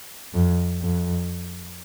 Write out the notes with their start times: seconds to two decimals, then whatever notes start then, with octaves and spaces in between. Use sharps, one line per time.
0.34 F2
0.81 F2